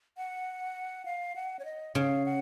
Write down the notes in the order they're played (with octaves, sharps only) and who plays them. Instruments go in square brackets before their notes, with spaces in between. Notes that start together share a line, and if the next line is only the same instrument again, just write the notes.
[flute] F#5
F5
F#5
C#5
D#5
[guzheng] C#3 [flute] F5
[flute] F#5